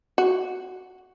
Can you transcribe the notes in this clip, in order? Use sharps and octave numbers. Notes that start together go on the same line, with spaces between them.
F#4